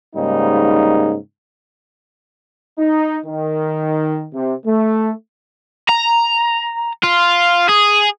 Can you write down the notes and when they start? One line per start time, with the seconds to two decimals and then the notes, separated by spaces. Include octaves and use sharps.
0.15 G#2 C#3 G3 A#3 D#4
2.79 D#4
3.26 D#3
4.34 C3
4.66 A3
5.89 A#5
7.04 F4
7.69 G#4